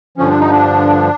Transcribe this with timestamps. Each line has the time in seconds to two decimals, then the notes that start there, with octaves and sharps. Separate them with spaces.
0.18 G2 D3 F3 C#4
0.29 D4
0.40 D#4
0.52 D4